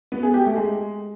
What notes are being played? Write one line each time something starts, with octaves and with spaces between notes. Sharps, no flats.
B3
G#4
G4
A3
G#3